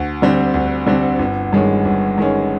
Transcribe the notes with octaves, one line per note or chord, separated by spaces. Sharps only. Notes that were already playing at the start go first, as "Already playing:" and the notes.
Already playing: D2
D3 G3 C4
D2
D3 G3 C4
G1
G2 D#3 G#3 C#4
G1
G2 D#3 G#3 C#4